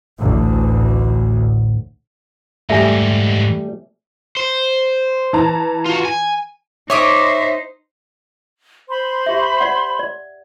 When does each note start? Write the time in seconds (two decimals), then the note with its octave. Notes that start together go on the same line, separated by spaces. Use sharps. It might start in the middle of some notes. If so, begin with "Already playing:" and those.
0.19 A1 D2
2.70 G#2 E3 G3 A3 E5 G#5
4.37 C5
5.33 E3 A5 A#5
5.86 F4 F#4
6.05 G#5
6.90 D#4 C5 C#5 E5 C6 D6 D#6
8.89 C5 B5 C6
9.26 G4 E5
9.60 D5 F#5
9.99 D5